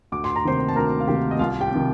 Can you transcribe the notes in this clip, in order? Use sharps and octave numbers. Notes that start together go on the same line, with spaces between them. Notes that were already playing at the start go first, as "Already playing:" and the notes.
D2 D6
C6
A#5
C3 D#3 A#3 C5 C6
A5
D2 A#4 A#5
F5
C3 D#3 A#3 G4 G5
D#5
C2 F4 F5
G4 G5
C3 D#3